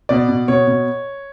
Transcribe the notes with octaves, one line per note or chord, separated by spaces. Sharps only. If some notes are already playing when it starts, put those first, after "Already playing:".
B2 D5
B2
B2 C#5
B2